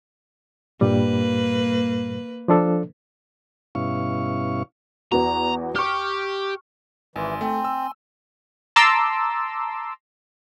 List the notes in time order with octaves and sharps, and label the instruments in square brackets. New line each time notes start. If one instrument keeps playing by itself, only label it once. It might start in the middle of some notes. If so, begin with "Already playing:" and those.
[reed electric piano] G2 A#2 G3 [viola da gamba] A#3 B4
[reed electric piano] F3 D4 A4
[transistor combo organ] G2 B2 C#4 E4 F5 C#6
[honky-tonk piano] E2 B3 F#4 [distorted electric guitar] A#5
[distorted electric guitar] G4 [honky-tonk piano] C#6 F6
[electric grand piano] G#1 [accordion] E3 [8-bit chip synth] G#5 C6
[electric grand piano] A3 [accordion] C4
[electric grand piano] E6
[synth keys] A5 A#5 C6 D6 E6